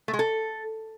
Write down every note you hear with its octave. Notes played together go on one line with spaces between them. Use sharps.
A3
G#3
A4